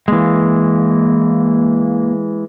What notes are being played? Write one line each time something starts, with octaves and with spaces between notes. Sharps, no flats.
E3 G#3 A#3